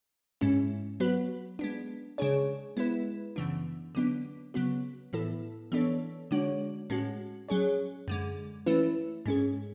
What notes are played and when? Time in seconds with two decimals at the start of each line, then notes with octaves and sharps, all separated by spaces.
0.41 G#2 G#3 C#4 E4
1.00 F#3 B3 F#4 B4
1.59 G#3 B3 D4
2.18 C#3 G#3 D4 G#4 C#5
2.77 G#3 B3 E4 B4
3.36 F#2 C#3 E3 B3 D4
3.95 D3 F#3 B3 D4
4.54 C#3 F#3 B3 F#4
5.13 A2 E3 B3 E4 A4
5.72 E3 B3 D4 A4 C#5
6.31 D3 G#3 D4 F#4 C#5
6.90 A2 G#3 C#4 F#4
7.49 F#3 C#4 G#4 C#5
8.08 F#2 D3 G#3
8.66 E3 A3 C#4 E4 B4
9.26 G#2 G#3 C#4 G#4